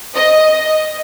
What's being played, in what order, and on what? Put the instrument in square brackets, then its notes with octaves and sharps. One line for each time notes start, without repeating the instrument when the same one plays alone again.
[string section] D#5